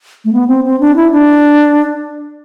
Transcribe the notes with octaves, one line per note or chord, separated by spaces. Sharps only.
A3
B3
C4
C4
D4
E4
D4